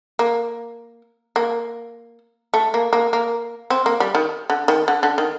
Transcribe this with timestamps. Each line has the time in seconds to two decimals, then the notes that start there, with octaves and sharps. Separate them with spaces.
0.19 A#3
1.36 A#3
2.54 A3
2.74 A#3
2.93 A#3
3.13 A#3
3.70 C4
3.86 A#3
4.00 G3
4.15 D#3
4.50 D3
4.68 D#3
4.88 D3
5.03 D3
5.18 D#3